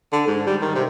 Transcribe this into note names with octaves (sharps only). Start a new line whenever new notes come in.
D3
G#2
G3
D#3
C3